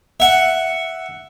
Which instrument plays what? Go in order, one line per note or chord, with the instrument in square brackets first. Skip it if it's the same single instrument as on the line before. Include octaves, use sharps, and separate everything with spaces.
[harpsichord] E5 F#5